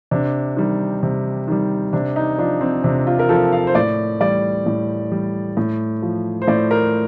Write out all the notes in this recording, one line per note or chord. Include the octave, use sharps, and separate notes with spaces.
C3 D4
D#3 G3
C3
D#3 G3
C3 D4
D#4
F3 D4
C4
C3 D4
F4
A#4
F3 A4
F5
C5
A2 D5
G3 D5
A2
G3
A2
F3
C5
A2 D5
A#4